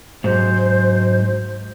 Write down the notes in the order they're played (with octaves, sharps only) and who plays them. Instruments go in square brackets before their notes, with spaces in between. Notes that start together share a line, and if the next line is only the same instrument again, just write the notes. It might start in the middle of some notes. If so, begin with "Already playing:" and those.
[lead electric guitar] G#2 F#3 [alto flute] C5